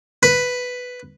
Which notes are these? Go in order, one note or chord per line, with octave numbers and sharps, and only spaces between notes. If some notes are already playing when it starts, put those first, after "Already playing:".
B4